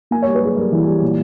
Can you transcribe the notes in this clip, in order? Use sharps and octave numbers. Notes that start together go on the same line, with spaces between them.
A#3 G#5
G3 C#5
B4
G3 G#4
G3 A#4
E3
G3
A#2